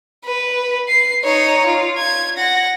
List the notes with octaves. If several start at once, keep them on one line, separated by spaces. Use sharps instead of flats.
B4
C7
D#4 C#5
F4
G#6
F#5 A#6